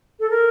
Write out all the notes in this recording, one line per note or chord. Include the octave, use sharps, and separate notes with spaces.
A4
A#4